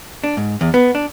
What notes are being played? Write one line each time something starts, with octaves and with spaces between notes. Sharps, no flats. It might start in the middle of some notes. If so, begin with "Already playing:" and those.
D4
G#2
E2
B3
D4